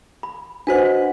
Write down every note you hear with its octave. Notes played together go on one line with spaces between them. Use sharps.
B5
D4 F#4 B4 C5 D#5 F#5
F#4